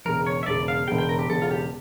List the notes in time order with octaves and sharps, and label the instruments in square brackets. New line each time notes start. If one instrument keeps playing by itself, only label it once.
[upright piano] E1 E2 C#3 [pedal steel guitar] A#4
[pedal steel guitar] C#5
E5
[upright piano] E1 E2 C#3 [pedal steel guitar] D5
[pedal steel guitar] F5
[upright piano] E1 E2 C#3 [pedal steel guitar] G5
[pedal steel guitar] G5
A#4
G4
[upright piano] E1 E2 C#3 [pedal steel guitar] A4
[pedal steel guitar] F4
G4